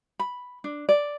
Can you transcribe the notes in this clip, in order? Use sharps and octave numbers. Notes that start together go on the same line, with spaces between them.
B5
D4
D5